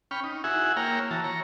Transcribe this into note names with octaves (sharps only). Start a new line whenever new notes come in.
C#4 G5 B5 C#6 F6
D#4
E4 F#4 G#4 E5 F#5 G#5
A#3 C#5 G5 A#5 F6
E3 F#4 A5
C#5 A#5